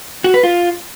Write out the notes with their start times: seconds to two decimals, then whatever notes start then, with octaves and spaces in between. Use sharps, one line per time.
0.24 F#4
0.34 B4
0.43 F4